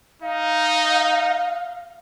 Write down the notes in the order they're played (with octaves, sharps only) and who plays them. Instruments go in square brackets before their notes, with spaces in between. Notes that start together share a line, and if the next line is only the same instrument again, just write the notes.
[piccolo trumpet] D#4 [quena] F5